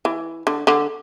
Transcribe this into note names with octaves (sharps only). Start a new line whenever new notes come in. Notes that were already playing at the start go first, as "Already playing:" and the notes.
E3
D3
D3